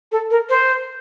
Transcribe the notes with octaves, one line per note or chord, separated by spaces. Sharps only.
A4
A#4
C5